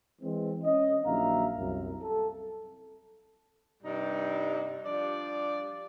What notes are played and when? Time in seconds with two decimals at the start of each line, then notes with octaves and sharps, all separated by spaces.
0.22 E3 G#3 C4
0.64 C#4 D#5
1.06 A#1 D#3 F#3 E5 F5 A#5
1.57 C2 F#2
2.02 A4
3.83 G2 C3 G3 D#4
4.85 F3 G3 D4 D5